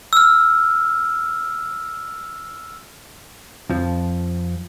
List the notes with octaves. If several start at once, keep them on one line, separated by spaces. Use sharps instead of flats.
E6 F6
F2 F3